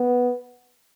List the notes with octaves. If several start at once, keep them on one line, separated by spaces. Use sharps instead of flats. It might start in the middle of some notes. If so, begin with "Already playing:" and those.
Already playing: B3